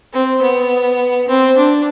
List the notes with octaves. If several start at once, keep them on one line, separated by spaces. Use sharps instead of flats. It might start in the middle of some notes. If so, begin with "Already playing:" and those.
C4
B3
C4
D4